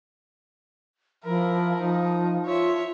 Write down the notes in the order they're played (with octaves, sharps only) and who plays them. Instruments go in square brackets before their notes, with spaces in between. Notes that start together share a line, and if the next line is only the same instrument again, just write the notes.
[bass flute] F3 [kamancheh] E4 A#4
[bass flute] F3 [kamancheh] D#4
[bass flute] F4 [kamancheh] C#5 E5